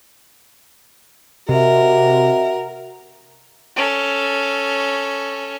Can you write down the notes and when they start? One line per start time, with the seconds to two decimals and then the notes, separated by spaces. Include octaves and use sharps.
1.49 C3 F#4 A#4 D#5 E5
3.76 C#4 A4